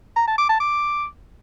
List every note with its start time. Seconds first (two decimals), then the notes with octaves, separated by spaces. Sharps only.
0.17 A#5
0.28 A5
0.38 D6
0.49 A5
0.60 D6